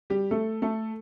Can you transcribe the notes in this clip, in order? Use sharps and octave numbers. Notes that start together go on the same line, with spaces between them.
G3 G4
A3 A4
A3 A4